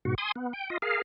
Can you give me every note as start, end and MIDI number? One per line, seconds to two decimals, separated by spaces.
0.05 0.15 44
0.05 0.15 47
0.05 0.15 66
0.18 0.32 80
0.18 0.32 84
0.18 0.32 87
0.36 0.53 59
0.53 0.70 79
0.70 0.78 65
0.70 0.78 75
0.82 1.02 68
0.82 1.02 70
0.82 1.02 77